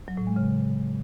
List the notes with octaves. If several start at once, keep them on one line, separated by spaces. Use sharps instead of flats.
F#3
A2
G#3
C#3